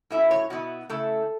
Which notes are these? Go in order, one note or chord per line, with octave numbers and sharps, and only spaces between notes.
A2 F#3 A3 C#4 E4 E5
C#5
B2 B3 E4 F#4
C#3 A3 E4 A4